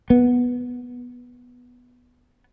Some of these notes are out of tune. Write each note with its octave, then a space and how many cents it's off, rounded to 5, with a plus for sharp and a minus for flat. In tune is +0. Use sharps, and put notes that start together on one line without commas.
B3 -5